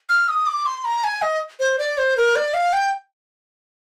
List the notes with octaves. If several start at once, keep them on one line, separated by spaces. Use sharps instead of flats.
F6
D#6
D6
C6
A#5
G#5
D#5
C5
D5
C5
A#4
D5
F5
G5